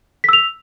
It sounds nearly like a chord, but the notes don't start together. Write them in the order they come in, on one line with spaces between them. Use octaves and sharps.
B6 E6 F7